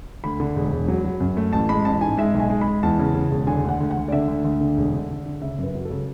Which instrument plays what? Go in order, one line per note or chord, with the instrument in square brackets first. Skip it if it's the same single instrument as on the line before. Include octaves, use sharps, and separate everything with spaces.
[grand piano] D2 B5
D3
E1
E1
F#3
F#3
F#2
A3
A1 A5
G#3 B5
A1 A5
G#2 G#5
G#3 E5
B1
G#5
G#3
B5
G#3
E2 A5
C#3
C#3
E1
D3 G#5
D2 F#5
D2
F#5
D2
D5
D3 E5
D2
D2
D3
E1
D3
D3
D3
C#3 E5
F#2 B4
F#3
A4
C#3